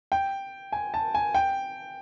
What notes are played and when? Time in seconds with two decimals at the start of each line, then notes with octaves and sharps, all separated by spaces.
0.12 G5
0.72 G#5
0.94 A5
1.15 G#5
1.35 G5